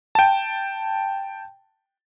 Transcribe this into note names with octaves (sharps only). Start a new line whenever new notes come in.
G5 A5